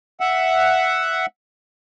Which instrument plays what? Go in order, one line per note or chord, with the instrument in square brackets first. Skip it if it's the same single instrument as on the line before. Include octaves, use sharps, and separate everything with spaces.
[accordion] E5 F#5